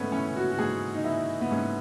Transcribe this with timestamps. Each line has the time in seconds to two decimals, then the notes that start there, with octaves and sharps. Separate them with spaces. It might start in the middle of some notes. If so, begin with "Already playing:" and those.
Already playing: G#2 A3 B3 C#4
0.12 E3 C#4
0.36 F#4
0.52 F#4
0.59 G#2 G#4
0.94 D#4
1.04 E3 E4
1.41 B3
1.51 G#2 C#4